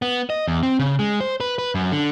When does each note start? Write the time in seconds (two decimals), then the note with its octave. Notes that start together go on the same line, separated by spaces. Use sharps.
0.02 B3
0.30 D#5
0.47 E2
0.63 C4
0.79 C#3
0.99 G#3
1.20 C5
1.40 B4
1.58 B4
1.75 F#2
1.92 D3